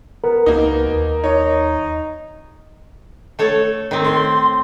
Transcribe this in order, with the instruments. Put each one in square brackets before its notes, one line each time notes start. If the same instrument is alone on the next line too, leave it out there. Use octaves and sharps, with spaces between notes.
[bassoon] B3 [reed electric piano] A#4
[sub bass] C#2 [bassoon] B2 [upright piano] A#3 D#4
[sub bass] D#2
[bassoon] D#4 [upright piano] C#5
[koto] A3 A4 C#5
D#3 C4
[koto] A2 [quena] C6